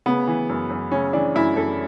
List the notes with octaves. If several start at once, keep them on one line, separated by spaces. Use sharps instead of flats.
C#3 B3
E3
F#2
F#2
C#3 C#4
E3 D4
F#2 E4
F#2 A4